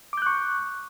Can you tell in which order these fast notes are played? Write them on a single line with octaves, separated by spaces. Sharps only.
D6 G6 F#6 C#6